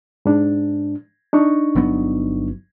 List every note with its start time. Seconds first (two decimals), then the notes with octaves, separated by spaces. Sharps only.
0.25 G#2 D4
1.33 D4 D#4 C#6
1.75 G1 F#3 B3